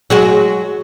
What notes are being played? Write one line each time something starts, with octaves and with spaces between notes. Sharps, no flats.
F#3 G#3 F#4